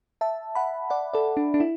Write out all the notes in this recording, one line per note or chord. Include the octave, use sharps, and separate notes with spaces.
E5 A5
F#5 B5
D5 F#5
A4 D5
D4
D4
E4